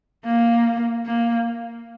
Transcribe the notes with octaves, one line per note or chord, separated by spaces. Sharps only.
A#3
A#3